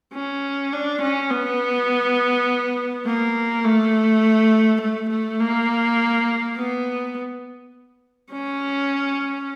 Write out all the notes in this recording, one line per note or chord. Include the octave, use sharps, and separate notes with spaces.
C#4
D4
C#4
B3
A#3
A3
A3
A3
A#3
B3
C#4